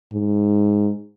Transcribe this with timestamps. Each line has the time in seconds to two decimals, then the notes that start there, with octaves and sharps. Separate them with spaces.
0.13 G#2